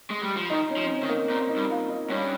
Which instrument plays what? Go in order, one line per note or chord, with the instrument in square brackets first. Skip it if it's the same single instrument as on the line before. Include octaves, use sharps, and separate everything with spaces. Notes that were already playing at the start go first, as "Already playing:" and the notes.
[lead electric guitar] G#3
G3
F3
[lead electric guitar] D#3 [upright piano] D#4
[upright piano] C#4
[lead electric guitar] F3
[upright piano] C#4
C4
[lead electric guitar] D#3
[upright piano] A#3
[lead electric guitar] A#2 [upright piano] C4
[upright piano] D#4
[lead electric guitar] G2
[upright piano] F4
D#4
[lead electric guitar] G2 [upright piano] C#4